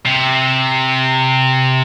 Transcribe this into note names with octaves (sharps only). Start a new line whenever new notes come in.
C3